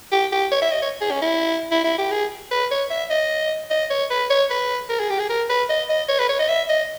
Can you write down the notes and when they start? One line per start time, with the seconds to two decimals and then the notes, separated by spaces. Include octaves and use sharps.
0.12 G4
0.32 G4
0.52 C#5
0.62 E5
0.72 D#5
0.82 C#5
1.01 G#4
1.11 C#4
1.22 E4
1.72 E4
1.84 E4
1.98 G4
2.11 G#4
2.51 B4
2.71 C#5
2.90 E5
3.10 D#5
3.71 D#5
3.90 C#5
4.11 B4
4.30 C#5
4.50 B4
4.89 A#4
5.00 G#4
5.10 G4
5.19 G#4
5.29 A#4
5.50 B4
5.69 D#5
5.89 D#5
6.09 C#5
6.19 B4
6.29 C#5
6.39 D#5
6.49 E5
6.69 D#5